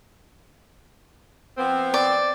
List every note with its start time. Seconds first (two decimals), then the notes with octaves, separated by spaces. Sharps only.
1.58 F3 B3 C4
1.94 D5